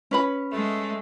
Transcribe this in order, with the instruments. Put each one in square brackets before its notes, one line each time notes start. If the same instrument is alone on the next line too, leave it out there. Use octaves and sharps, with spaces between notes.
[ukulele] C#4 B4 B5
[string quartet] G#3 A3